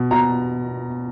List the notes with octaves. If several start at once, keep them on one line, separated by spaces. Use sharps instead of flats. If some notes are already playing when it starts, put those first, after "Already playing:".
Already playing: B2
B2 A#5